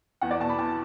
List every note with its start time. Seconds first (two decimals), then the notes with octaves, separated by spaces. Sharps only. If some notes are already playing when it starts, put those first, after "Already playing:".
0.21 E2 F#5
0.31 D5
0.40 B2 A5
0.49 B5
0.59 E2 A5